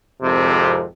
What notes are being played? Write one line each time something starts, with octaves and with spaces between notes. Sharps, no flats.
G#1 F2 C3